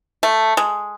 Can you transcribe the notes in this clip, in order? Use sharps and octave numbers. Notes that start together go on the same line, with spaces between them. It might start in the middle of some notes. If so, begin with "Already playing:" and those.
A3
G#3